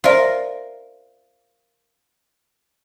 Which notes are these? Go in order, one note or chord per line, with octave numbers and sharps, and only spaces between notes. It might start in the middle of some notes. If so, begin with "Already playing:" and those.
F4 A#4 C5 D5 E5